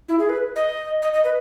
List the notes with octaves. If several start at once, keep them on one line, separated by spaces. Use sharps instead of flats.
E4
G#4
B4
D#5
D#5
D#5
B4